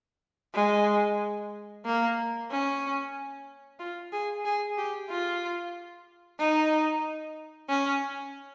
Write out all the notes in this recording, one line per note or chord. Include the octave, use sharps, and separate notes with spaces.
G#3
A#3
C#4
F4
G#4
G#4
G4
F4
D#4
C#4